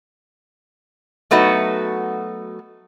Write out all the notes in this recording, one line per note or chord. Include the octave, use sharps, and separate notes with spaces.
F#3 A3 B3 D#4 F#4